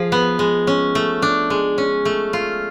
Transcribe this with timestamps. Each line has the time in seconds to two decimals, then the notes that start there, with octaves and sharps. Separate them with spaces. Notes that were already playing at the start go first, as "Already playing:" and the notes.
Already playing: F3 G#4
0.12 B3
0.39 G#3
0.67 C#4
0.95 A3
1.22 D4
1.50 G#3
1.78 C#4
2.05 A3
2.33 F4